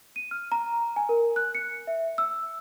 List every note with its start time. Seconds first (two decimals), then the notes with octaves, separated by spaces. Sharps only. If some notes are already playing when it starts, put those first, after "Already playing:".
0.16 D#7
0.31 F6
0.52 A#5
0.96 G#5
1.09 A#4
1.36 F#6
1.55 C#7
1.87 E5
2.18 E6